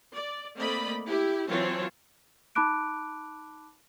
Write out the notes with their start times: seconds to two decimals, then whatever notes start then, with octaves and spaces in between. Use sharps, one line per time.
0.13 D5
0.55 A3 A#3 C4 D5 D#5 B5
1.07 E4 G4
1.49 E3 F#3 C4 F4 C#5 A5
2.55 D#4 A5 B5 D6 F#6 D7